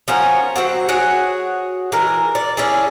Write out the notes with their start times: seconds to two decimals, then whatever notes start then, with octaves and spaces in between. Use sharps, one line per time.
0.08 F3 C#4 F#4 A#4
0.56 F#3 G#3 C4 F#4
0.89 F#4 G#4 C#5
1.92 E3 G#3 A#4
2.35 D5
2.57 C#4 D4 E4 G#4